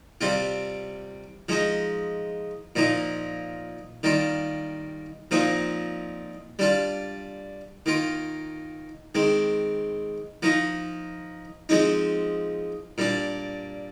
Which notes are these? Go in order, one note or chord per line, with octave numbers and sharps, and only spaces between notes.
C3 G3 C4 F4
F3 G#3 D#4
A#2 F3 A#3 D#4
D#3 G3 A#3 F4
A#2 F3 C4 D#4
G3 D4 F4
D#3 A#3 F4
D#3 G#3 C4
F3 A#3 D#4
F3 G#3 C4 D#4
A#2 G3 D4